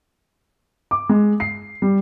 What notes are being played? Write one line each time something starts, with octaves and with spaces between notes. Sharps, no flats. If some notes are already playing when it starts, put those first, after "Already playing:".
D6
G#3
C7
G3